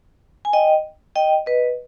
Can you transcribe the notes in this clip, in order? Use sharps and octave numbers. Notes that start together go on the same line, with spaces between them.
G#5
D#5 G5
D#5 G5
B4 D#5